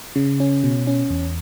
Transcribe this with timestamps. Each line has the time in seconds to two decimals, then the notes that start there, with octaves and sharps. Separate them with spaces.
0.16 C#3
0.40 C#4
0.64 B2
0.87 C#4
1.10 E2